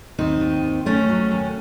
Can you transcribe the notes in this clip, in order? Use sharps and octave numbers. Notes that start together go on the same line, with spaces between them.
D#2 C4 D#4
D#2
D#2
D#3 A3 C#4
F#3
D#2